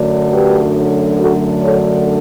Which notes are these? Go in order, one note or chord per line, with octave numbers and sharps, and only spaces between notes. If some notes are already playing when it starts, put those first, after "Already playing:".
Already playing: F#2 D3 F#3 A3 D4
G4 B4
F#4 A4
A4 C#5